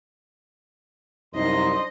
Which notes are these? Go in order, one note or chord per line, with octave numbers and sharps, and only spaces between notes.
C2 F#2 D4 D#4 C5 D#5 C6